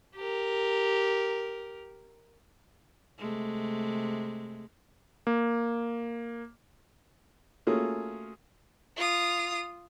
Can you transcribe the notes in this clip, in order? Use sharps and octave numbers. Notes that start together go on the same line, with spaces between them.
G4 A#4
C3 G#3 A3
A#3
A3 A#3 C#4 F4 F#4 G#4
F4 D#6